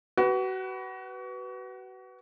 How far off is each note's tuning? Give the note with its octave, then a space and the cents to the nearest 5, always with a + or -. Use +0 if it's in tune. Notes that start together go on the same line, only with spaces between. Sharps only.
F#4 +30 B4 +0